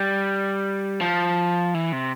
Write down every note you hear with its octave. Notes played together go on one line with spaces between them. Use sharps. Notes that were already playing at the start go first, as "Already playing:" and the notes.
Already playing: G3
F3
E3
C3